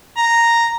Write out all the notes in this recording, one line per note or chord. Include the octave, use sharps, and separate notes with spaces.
A#5